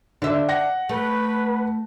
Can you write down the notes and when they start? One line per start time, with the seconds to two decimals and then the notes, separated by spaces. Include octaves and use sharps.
0.22 D3 D4 E5
0.49 F#5 A#6
0.89 A3 B4